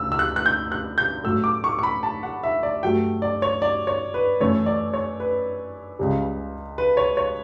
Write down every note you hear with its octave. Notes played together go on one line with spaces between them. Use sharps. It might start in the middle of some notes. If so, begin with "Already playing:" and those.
Already playing: D2 C#3 E6
E6
F#6
F#6
G6
F#6
G6
A2 F#3 A3 E6
D6
C#6
C#6
B5
A5
F#5
E5
D5
G2 F#3 A3 G5
D5
C#5
D5
C#5
B4
F#2 E3 A3 C#5
D5
C#5
B4
C#2 C#3 G3
B4
C#5
C#5